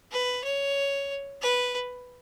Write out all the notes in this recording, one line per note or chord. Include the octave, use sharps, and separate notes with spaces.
B4
C#5
B4